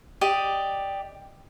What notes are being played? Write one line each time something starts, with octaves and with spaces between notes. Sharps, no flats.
G4 D5 D#5